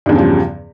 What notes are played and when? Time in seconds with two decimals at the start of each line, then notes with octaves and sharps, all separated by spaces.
0.06 G2
0.09 E2
0.12 C#3
0.15 F3
0.18 G3